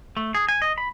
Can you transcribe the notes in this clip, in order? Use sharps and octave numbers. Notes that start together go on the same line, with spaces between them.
A3
G#4
G#5
D#5
B5